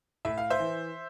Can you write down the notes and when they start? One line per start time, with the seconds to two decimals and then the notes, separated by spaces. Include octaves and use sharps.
0.25 A2 E5
0.38 F5
0.50 C5 E5
0.60 E3